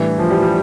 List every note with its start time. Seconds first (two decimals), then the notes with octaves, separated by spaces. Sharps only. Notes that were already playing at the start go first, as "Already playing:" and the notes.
Already playing: A2 E3 G3 D4
0.19 F3
0.30 G3
0.42 G3